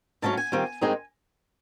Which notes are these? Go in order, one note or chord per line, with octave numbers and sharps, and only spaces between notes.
G#2 D#3 F#3 A3 C#4 A5
G#5
D#3 G3 C4 F4
G2 D#3 G#3 C4 D#4